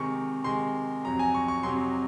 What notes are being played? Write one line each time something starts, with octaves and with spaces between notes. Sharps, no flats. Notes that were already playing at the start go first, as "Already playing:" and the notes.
Already playing: C3 D#3 G#3 C#6
C3 D#3 G#3 C6
F2 C3 F#3 A#5
G#5
C#6
C#6
F2 C3 F#3 C6